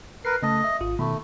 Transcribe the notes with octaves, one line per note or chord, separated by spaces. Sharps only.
A#4 B4 C7
C#3 A3 D#5 A5
E5
G#1 F4 D#6
B2 D#3 A3 B5